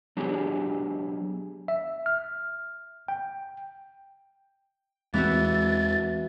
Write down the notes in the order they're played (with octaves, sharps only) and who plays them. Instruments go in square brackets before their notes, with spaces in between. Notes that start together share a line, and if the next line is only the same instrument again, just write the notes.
[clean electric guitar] F#3 B3 D4 G4 G#4
[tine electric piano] E5
F6
G5
[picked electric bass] E2 G#3 C4 [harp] E3 E4 F#4 [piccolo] A6